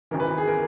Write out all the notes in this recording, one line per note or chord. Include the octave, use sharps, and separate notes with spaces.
G#1 F#2 E3 A#4
B4
G#4
A#4